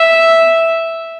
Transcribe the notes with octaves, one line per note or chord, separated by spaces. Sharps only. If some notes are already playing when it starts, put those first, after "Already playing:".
Already playing: E5